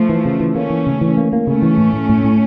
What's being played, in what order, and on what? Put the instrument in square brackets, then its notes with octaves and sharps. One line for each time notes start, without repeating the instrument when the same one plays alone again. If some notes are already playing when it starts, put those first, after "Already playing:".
Already playing: [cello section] F3 A3
[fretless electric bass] E3
C#3
E3
[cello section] A3 C#4 [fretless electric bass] A#3
[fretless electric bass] E3
C#3
E3
A#3
A#3
[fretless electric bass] C#3 [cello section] A3 C#4
[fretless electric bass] E3
A2
A2
A2
A2